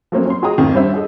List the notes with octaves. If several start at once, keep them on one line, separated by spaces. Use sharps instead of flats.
F3 F#3 A3 A#3 C4 C#4
C#4 C6
F#4 G#4 D#5 G5 A#5 D#6
G#1 F2 D#3
G3 C#4 D4 C5 E5
G#4 A4 D#5